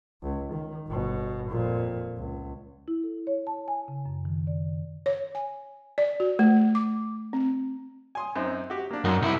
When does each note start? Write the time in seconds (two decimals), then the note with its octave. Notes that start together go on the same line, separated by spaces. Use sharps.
0.22 C#2
0.53 D#3
0.88 G1 B2
1.49 F2 A#2
2.17 C#2
2.88 E4
3.03 A4
3.27 C#5
3.47 A5
3.68 G#5
3.88 C#3
4.06 F#2
4.25 D#3
4.47 D5
5.06 C#5
5.35 G#5
5.98 D5
6.20 F#4
6.39 A3
6.75 D6
7.33 C4
8.15 G#5 C6 D#6
8.36 F#2 C4 D#4
8.70 F#4 G4
8.91 A#3 D4
9.04 F#2 D#4 F#4 A#4
9.22 C2 E4